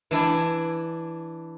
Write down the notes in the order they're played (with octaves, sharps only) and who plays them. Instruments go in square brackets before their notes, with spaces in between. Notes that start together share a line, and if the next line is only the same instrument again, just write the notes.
[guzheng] E3 D4 E4 G#5